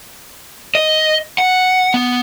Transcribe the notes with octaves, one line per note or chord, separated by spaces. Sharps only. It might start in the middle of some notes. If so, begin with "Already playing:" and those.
D#5
F#5
B3